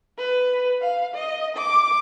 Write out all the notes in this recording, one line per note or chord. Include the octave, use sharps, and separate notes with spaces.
B4
F5
D#5
D6